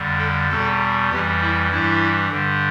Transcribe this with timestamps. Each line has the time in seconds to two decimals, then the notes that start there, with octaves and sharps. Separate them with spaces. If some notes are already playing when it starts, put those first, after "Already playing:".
Already playing: F2 D3 G3
0.19 A4
0.49 E2 B2 G3 A4
1.10 F2 E3 G3 G4
1.41 E4
1.71 G2 E3 G3 E4
2.31 G2 D3 G3